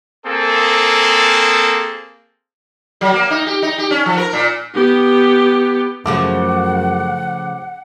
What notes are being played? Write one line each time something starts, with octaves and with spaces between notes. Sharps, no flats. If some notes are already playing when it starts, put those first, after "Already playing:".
A#3 C4 G#4 A4
F#3
A#3
D#4
G4
D#4
G4
C#4
F3
A#4
A#2
B3 G4
F#2 C#3 F3 A3 F#5 D6